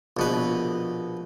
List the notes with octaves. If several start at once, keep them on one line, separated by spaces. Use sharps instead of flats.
A#1 B2 B4